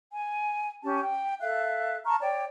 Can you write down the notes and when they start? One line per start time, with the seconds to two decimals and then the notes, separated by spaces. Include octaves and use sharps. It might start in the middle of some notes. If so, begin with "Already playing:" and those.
0.12 G#5
0.84 C#4 G4 A5
1.01 G5
1.40 A4 E5 F5 F#6
2.05 A5 A#5 C#6 F6
2.21 C#5 D5 G5